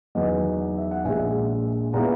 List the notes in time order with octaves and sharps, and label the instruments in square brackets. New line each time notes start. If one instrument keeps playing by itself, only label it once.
[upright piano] E2 D#3 F#3 D#5 F#5
E5
F#5
A#1 A#2 G#3 E5 G#5
A#2 G#3 B3 E4 F#5 A#5